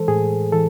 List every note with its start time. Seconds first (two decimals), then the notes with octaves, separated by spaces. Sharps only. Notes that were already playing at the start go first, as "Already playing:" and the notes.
Already playing: E3 G#3 A4 C5
0.08 A2 G#4
0.52 E3 A4